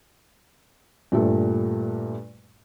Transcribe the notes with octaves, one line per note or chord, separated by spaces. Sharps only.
G2 A#2 G3 A3